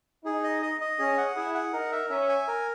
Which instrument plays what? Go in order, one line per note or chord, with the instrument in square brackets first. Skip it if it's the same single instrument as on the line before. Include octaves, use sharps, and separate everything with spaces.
[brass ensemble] D#4 [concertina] G#4
[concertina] D#5
D#5
D#5
[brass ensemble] C#4 [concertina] G#4
[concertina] F#5
[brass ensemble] E4 [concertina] G#4
[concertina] F#5
[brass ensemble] D#4 [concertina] A#4
[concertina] E5
[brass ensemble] C#4 [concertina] E5
[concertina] G#5
A#4